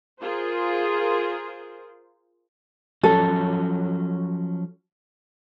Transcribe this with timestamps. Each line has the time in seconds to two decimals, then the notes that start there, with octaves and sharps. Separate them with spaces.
0.21 F4 G#4 A#4 C5
3.03 F3 F#3 C#4 A4